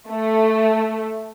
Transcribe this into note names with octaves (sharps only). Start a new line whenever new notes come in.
A3